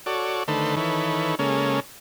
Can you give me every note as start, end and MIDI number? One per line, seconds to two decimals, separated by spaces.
0.06 0.43 66
0.06 0.43 69
0.06 0.43 73
0.06 0.43 74
0.48 0.75 50
0.48 0.75 51
0.48 0.75 57
0.48 0.75 69
0.48 0.75 71
0.48 0.75 72
0.77 1.35 51
0.77 1.35 52
0.77 1.35 69
0.77 1.35 71
0.77 1.35 73
1.39 1.80 49
1.39 1.80 56
1.39 1.80 58
1.39 1.80 61
1.39 1.80 69